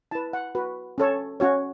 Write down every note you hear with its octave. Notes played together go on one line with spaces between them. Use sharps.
E4 B4 A5
F#5
F#4 B4
C#4 A4 C#5
C#4 F#4 C#5